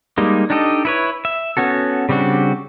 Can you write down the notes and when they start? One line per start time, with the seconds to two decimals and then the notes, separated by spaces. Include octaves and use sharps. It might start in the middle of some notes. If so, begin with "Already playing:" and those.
0.18 G3 G#3 A#3 D#4
0.50 D4 D#4 G4 A4 D#5
0.85 E4 B4 C#5
1.25 E5
1.57 B3 C#4 F#4 A4
2.09 C#3 G3 C4 D4 F#4